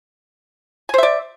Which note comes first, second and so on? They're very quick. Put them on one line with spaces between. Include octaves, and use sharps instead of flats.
G#5 C5 E5 D5